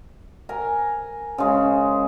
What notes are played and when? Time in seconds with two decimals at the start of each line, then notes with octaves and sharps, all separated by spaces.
0.49 A#4 G#5
1.38 C#3 G#3